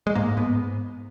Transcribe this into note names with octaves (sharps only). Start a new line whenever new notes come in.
G#3
G#2 A#3
G#2 B3